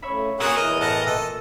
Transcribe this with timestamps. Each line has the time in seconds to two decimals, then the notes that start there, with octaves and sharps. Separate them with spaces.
0.02 A2 C#3 C#5 E5 B5
0.40 A#2 C#3 C#4 F#4 G#4 A#4 F#5
0.56 E2 E3 A#4 D#5
0.81 A2 A#4 E5 F#5 A5 A#6
1.06 A#2 A4